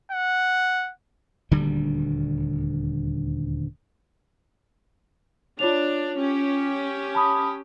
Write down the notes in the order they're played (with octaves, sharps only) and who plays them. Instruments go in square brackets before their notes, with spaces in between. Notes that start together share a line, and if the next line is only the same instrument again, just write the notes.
[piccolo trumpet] F#5
[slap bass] D#1 D2 D3 G3
[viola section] D4 [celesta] F4 C#5 F7
[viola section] C#4 G4
[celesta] A5 B5 D#6